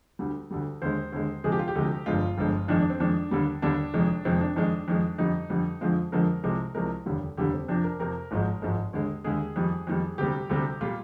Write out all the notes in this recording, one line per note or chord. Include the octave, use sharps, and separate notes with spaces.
D2 D3 G3
D2 D3 G3
D#2 D3 G#3 C5
D#2 D3 G#3
D2 C3 F3 G#3 G#4
G4
F4
G4
D2 C3 F3 G#3
G1 G2 F3 G#3 F4
G1 G2 F3 G#3
F2 D#3 G#3 D4
D4
C4
F2 D#3 G#3 D4
D#2 D3 G3
D#2 D3 G3 D4
F1 F2 D#3 G#3
F1 F2 D#3 G#3 C4
D4
F2 D#3 G#3 D4
F2 D#3 G#3
F2 D3 G3 D#4
F2 D3 G3
F2 D3 F3 G#3 F4
F2 D3 F3 G#3 A#4
C2 C3 F3 G#3
C2 C3 F3 G#3 A#4
F1 D#2 D3 G3
F1 D#2 D3 G3 G4
C4
F2 C3 F3 D4
A#4
F2 C3 F3 A#4
G#1 G#2 F3 G#3
G#1 G#2 F3 G#3
D#2 D3 G#3
D#2 D3 G#3 G#4
F2 D#3 G3
F2 D#3 G3
D2 C3 G3 G4
D2 C3 G3
A#2 G3 F4